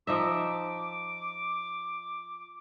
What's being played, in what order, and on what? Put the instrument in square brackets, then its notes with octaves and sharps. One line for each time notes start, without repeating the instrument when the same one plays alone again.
[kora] F3 D#4 E5 [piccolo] D6